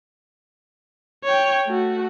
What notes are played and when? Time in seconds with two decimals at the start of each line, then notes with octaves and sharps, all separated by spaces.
1.24 C#5 G5
1.66 A3 F#4